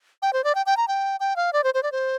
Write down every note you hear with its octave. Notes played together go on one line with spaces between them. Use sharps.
G5
C5
D5
G5
G5
A#5
G5
G5
F5
D5
C5
C5
D5
C5